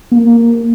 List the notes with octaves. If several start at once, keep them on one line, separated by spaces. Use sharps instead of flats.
A#3